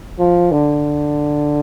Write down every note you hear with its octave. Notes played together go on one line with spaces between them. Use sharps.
F3
D3